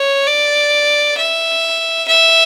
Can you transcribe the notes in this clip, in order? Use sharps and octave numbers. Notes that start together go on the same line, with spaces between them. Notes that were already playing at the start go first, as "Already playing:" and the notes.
Already playing: C#5
D5
E5
E5